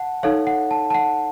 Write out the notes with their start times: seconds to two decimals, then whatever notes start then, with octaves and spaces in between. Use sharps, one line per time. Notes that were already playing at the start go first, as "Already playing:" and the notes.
Already playing: F#5 A5
0.23 D#4 A4 C#5 F5
0.47 F#5
0.71 A5
0.90 A5
0.95 F#5